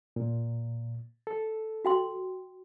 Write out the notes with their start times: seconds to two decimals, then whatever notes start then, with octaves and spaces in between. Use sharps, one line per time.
0.16 A#2
1.27 A4
1.85 F#4 G5 C6